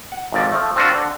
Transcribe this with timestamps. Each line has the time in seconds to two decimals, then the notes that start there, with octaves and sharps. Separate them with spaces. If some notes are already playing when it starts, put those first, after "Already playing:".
0.12 F#5
0.32 G#1 F2 D5
0.52 F3 A3
0.76 C4 D4 F4 F#4
0.94 D3